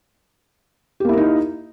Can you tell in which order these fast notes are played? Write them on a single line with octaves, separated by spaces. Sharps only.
G4 A#3 E4 A#4 D#4